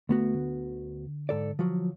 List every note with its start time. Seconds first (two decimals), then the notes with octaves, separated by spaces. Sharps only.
0.09 D2 A3 B3 F#4
0.34 D3
1.29 G#2 A4 D5
1.59 F3 F#3